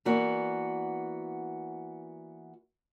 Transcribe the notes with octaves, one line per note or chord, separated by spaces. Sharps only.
E3 A#3 B3 F#4 D5